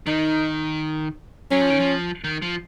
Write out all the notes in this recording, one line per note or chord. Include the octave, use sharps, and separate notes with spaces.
D#3 D#4
F#3 C#4
F3
D#3
F3
D#3
F3